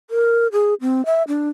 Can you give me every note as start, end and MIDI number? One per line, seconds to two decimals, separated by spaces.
0.10 0.47 70
0.52 0.74 68
0.81 1.05 60
1.06 1.23 76
1.28 1.49 62